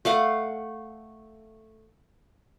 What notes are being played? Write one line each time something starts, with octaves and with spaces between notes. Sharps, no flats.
A3 F5 F#5